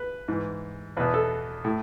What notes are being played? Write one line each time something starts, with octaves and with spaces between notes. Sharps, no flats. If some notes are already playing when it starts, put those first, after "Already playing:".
Already playing: B4
G#2 E3
E2 B2 B4
A4
A2